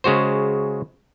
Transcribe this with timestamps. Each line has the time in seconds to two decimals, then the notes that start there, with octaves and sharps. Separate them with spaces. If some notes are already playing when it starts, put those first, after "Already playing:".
0.04 C#3 G#3 F#4 C5